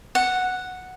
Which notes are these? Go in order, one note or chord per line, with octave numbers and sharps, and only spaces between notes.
F#5